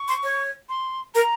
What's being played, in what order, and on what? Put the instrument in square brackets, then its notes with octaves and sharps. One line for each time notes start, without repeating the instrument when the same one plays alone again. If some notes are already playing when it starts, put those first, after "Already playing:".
Already playing: [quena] C#6
[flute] C6
C#5
[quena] C6
[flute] A#4 [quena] A#5